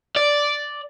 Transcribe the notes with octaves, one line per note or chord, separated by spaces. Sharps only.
D5